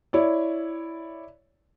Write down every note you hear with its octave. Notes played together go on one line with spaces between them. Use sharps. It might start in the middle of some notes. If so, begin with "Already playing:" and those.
E4 C#5 D5